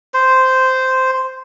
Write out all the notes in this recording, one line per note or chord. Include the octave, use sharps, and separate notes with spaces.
C5